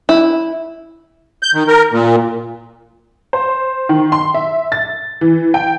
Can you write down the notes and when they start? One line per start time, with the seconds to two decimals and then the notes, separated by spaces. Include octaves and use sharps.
0.09 E4
1.43 G6
1.54 D#3
1.68 A#4
1.92 A#2
3.33 C5
3.89 D#3
4.12 C6
4.34 E5
4.72 A6
5.21 E3
5.54 G5